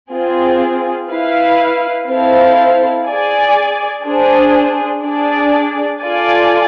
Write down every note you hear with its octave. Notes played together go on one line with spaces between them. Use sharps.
C4 F4 G#4
E4 B4 F5
C4 E4 A4 C5 F5
G#4 D5 G#5
D4 G#4 C5
D4 G#4 D5
F4 A4 D5 G#5